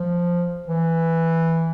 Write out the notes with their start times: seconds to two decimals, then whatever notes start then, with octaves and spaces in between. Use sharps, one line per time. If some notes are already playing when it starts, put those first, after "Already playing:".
Already playing: F3
0.68 E3